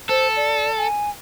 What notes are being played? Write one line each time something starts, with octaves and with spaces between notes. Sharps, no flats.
A4 C5
D5
G#5